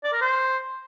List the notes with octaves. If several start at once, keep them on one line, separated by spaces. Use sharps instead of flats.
D5
A#4
C5